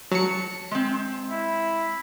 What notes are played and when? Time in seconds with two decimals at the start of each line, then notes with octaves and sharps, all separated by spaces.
0.11 F#3 A5 C#7
0.71 G#3 C4
1.30 E4